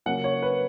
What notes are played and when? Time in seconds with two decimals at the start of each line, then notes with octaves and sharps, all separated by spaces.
0.06 C#3 F#3 A#3 F#5
0.24 C#5
0.42 B4